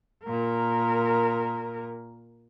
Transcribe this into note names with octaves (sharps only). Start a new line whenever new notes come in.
A#2 A#4